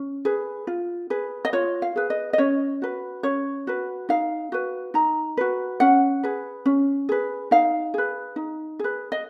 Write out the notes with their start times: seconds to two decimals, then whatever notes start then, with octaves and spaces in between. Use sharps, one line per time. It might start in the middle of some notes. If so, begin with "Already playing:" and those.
Already playing: C#4
0.25 G#4 B4
0.67 F4
1.10 G#4 B4
1.45 D#5
1.53 F4 C#5
1.82 F5
1.96 G#4 B4
2.10 D#5
2.33 D#5
2.38 C#4 C#5
2.82 F#4 B4
3.23 C#4 C#5
3.67 F#4 B4
4.09 D#4 F5
4.52 F#4 B4
4.94 D#4 A#5
5.37 F#4 B4
5.80 C#4 F#5
6.23 G#4 B4
6.66 C#4
7.09 G#4 B4
7.51 D#4 F5
7.94 G#4 B4
8.36 D#4
8.79 G#4 B4
9.12 D#5